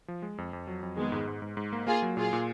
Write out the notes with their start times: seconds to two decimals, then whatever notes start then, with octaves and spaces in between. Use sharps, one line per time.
0.08 F3
0.22 G#3
0.38 F2
0.53 F2
0.67 F#3
0.83 F2
0.97 D#3 G#3 B3
1.12 G#2
1.27 G#2
1.42 G#2
1.57 G#2
1.73 A#3
1.87 A#3 F4 G#4
2.02 F#3
2.17 A#2 F4 G#4
2.33 A#2